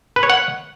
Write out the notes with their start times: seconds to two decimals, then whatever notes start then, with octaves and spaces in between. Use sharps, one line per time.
0.16 B4
0.23 C#5
0.30 F#5